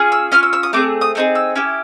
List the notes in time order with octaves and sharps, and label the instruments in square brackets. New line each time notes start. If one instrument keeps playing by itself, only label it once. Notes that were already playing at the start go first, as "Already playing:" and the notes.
Already playing: [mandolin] C#4 F4 G#4
E6
C#4 F4 F6
E6
E6
D#6
A3 C4 G#4 D6
D#6
A3 C4 D#4 G#4
E6
C#4 E4 G4